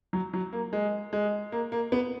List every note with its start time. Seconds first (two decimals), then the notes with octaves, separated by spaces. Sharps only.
0.13 F#3
0.34 F#3
0.53 A#3
0.73 G#3
1.13 G#3
1.52 A#3
1.72 A#3
1.92 B3